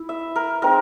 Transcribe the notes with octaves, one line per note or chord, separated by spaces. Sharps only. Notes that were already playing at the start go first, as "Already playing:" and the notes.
Already playing: E4
E5
A#4
G#3 C4 D#4 A#4